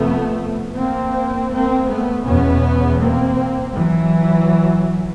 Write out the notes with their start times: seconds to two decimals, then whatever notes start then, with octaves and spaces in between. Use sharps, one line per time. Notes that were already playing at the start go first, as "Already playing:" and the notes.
Already playing: F2 C3 A3 B3
0.76 A#3 C4
1.52 A#3 C4
1.88 A3 B3
2.25 E2 B2 B3 C#4
3.00 A#3 C4
3.74 E3 F#3